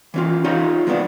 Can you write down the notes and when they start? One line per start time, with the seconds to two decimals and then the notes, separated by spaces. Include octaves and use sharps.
0.14 E3 C#4 F4
0.44 D#4 F4 G4 C#5 D#5 F5
0.87 F3 G#3 B3 C#4 D4